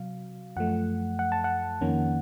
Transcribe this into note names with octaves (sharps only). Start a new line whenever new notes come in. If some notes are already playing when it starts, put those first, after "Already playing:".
Already playing: C3 F#3 F5
F#2 F3 A3 F#5
F#5
A5
F#5
F2 D#3 A#3 C#4